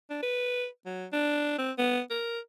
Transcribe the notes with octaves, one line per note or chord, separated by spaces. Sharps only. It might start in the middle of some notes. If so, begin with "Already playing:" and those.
D4
B4
F#3
D4
C4
B3
A#4